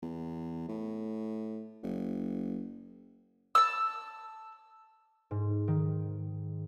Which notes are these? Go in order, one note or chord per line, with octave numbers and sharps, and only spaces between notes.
E2
A2
F#1
A5 E6
G#2
D#3